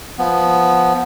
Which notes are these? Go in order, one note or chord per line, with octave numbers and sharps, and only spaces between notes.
F3 B3